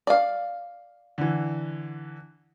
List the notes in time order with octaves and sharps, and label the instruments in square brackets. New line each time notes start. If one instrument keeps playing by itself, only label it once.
[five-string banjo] D5 F5
[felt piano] D3 E3